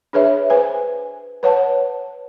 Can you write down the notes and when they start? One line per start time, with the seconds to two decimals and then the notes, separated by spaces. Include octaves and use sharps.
0.13 D4 G#4 B4 C#5 E5
0.50 B4 C5 G#5
1.43 B4 C#5 F#5 A5